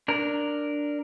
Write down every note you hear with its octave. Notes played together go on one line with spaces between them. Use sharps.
D4 A#4